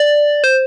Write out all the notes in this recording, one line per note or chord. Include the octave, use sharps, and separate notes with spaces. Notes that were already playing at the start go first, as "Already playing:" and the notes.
Already playing: D5
C5